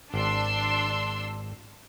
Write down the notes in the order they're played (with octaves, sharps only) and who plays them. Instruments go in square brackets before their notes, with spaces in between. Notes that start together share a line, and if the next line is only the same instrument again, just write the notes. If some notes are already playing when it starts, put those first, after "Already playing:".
[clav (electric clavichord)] G#1 [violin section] D4 C6 E6